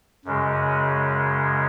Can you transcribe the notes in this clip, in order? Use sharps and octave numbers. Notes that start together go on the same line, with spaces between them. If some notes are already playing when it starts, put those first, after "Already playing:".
F#2 C#3 G#3